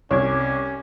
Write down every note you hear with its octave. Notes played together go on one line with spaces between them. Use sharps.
C2 C#4 C#5 D6 G#6